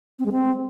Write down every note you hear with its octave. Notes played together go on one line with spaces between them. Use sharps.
C4
G#3
C4